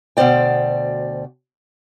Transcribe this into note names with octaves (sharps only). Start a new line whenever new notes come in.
D2 B2 F#3 C5 D5 G5